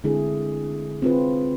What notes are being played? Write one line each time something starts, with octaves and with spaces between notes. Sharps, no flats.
D3 G#3 C4 E4 G#4
C4 F4 B4